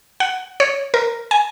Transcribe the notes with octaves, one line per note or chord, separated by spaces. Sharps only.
F#5
C#5
A#4
G#5